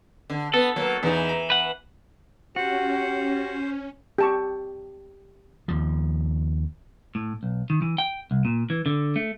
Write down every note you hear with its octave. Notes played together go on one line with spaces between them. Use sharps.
D3
B3 A4
F#3 A#3
E2 E3 D#4
A#5
B4 F#5
C#4 F#4 G4 C5
G4 A5 C#6
D#2 F3
A2
B1
D#3
E3
G5
C2
A#2
E3
D3
A3